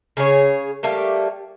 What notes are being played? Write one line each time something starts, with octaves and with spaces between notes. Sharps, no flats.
C#3 G#4 C#5
G3 A3 A#3 G4